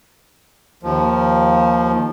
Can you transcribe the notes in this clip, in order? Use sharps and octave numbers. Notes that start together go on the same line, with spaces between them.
D#2 F3